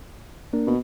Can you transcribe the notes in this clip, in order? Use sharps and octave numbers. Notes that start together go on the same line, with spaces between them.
A#3 D4 A#4
B2